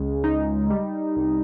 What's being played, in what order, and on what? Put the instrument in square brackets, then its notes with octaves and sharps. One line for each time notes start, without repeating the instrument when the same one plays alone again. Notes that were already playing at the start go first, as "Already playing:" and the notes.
Already playing: [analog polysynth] C#2 C#3 G#3
D#4
G3
C2